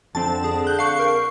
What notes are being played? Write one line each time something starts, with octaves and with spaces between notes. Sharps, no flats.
F2 D3 C4 A5
G#4
F#6 G6
F5 C#6 C7
A#4